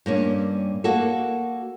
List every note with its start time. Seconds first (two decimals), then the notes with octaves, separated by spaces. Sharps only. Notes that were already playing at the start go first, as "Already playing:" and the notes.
0.06 G2 A#3 C#4
0.84 A#3 F#4 A4